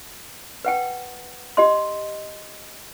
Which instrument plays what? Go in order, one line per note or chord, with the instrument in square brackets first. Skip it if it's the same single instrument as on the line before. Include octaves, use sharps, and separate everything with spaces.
[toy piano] B4 F#5 G5
G4 D#5 C6